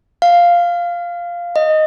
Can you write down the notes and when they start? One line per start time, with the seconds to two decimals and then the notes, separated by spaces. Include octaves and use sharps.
0.22 F5
1.56 D#5